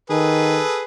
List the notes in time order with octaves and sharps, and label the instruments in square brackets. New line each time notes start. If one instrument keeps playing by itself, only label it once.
[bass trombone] D#3 [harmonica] G#4 A4 B4